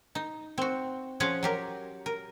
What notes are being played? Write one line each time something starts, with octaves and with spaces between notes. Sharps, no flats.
D#4
C4 F#4
F3 C#4 F4 G#4 F5 F#5
F#3 G4 A#4
A#4